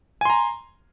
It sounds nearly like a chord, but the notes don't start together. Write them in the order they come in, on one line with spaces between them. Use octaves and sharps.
G#5 C6 A#5